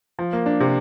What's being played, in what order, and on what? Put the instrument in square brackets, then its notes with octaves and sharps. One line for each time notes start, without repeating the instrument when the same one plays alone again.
[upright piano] F3
A#3
D4
C3